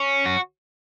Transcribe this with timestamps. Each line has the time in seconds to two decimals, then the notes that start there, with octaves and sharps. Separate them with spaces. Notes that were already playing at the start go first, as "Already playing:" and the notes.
Already playing: C#4
0.26 F#4